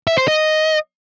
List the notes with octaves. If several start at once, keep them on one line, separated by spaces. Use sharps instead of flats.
E5
C5
D#5